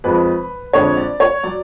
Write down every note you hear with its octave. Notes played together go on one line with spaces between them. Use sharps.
F2 F3 G#3 B4
F2 D3 G#3 C#5
D5
C#5
F#3 D5